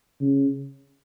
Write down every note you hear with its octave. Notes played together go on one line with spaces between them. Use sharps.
C#3